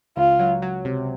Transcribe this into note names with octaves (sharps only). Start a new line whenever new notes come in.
C#2 F4
F#3
F#3
C3